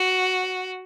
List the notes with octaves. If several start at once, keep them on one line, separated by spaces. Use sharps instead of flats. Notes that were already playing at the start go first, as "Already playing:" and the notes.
Already playing: F#4